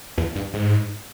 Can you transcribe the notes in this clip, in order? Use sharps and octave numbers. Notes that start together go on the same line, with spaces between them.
E2
G2
G#2